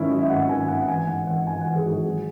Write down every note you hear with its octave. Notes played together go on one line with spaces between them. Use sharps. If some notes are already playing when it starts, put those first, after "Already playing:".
Already playing: G#2 D#3 C#4 E4
F#3 D#5
E5
G#1 F#5
D#3 G#5
G#1 F#5
F#5
E3 G#5
G#2 F#5
E3 F#5
G#1 G#5
E3 F#5
G#4
G#1 F#4
G#4
F#3